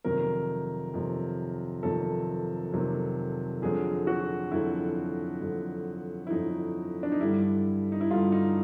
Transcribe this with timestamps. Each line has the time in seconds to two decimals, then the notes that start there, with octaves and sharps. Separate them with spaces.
0.04 F2 C3 D#3 F#3 A#4
0.94 F2 C3 D#3 F#3
1.83 F2 C3 D#3 F#3 A4
2.72 F2 C3 D#3 F#3
3.62 F2 D3 F#3 G#4
4.07 F#4
4.51 F2 D3 F#3 E4
5.41 F2 D3 F#3
6.27 E4
6.30 F2 D3 F#3 D#4
7.03 D4
7.12 D#4
7.21 G2 D3 G3 E4
7.92 D#4
8.01 E4
8.10 G2 D3 G3 F4
8.32 D#4